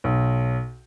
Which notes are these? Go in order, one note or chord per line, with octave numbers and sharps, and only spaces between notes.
B1